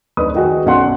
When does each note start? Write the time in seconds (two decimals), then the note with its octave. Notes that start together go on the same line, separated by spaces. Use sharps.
0.17 D1 D4 D#4 B4 D#6
0.35 D#3 D#4 F#4 G#4
0.66 B1 C#4 D5 F#5 C6 F#6